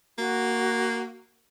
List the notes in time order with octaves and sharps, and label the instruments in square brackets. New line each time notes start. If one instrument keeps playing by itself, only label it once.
[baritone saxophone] A#3 [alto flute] F#4